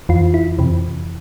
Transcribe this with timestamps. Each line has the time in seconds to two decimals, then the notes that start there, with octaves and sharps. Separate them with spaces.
0.09 F2 E3 F4
0.34 E4
0.59 F2 C3 E3